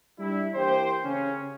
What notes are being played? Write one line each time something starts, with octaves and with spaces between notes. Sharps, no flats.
G3 D4 E4
E3 A#3 G4 C5
C#3 C#4